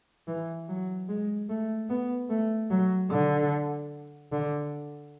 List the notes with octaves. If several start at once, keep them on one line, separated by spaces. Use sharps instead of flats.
E3
F#3
G#3
A3
B3
A3
F#3
D3
D3